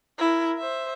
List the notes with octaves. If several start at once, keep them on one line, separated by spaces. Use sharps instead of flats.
E4 A#4
C5 E5